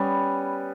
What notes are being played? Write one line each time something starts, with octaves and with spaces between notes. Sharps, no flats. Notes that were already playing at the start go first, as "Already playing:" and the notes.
Already playing: G3 B3 C#4